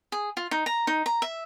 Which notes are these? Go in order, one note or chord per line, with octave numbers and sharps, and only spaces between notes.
G#4
F4
D#4
A#5
D#4
A#5
E5